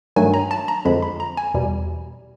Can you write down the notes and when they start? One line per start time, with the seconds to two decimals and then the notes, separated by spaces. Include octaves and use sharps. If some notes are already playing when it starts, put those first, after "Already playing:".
0.16 G2 D#3 F#3 A3 G#5
0.34 A#5
0.51 A5
0.68 A#5
0.85 F2 D3 F3 G#3 B5
1.02 B5
1.20 A#5
1.37 G#5
1.54 E2 B2 G3